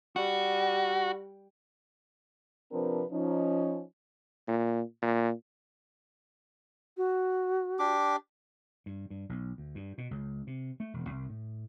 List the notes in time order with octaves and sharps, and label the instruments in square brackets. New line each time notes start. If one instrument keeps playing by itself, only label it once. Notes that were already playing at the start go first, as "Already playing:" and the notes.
[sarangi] G3 [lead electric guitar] F#4
[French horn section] C3 F3 C4 D4 A#4 B4
F3 C#4 D#4
[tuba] A#2
A#2
[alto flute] F#4
[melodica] D4 G4 D6
[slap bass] G2
G2
B1
D2
G2
B2
C#2
C3
A3
E1
C2
A2